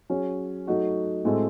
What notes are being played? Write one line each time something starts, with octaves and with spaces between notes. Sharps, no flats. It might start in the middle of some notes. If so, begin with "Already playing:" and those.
F#3 C#4 G#4 C#5
F#3 A3 D#4 F#4
A2 G#3 C4 F#4 A4